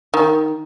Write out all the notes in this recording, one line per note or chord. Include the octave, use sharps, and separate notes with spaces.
D#3